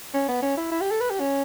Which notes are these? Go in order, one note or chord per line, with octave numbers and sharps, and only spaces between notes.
C#4
B3
C#4
E4
E4
G4
A4
B4
G4
C#4